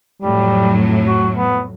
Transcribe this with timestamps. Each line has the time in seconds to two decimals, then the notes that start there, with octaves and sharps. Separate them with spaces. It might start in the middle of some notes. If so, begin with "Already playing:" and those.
0.22 F2 A2 F#3 G3
1.07 F#4
1.36 B3